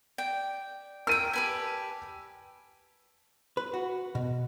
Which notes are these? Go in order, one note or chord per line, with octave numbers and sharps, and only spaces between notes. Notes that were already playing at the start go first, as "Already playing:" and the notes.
D5 G5
A#4 G5 E6 D#7
G4 B4 G#5 A5 B6
B4
F#4
B2